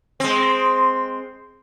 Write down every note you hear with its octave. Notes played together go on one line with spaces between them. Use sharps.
G#3 C4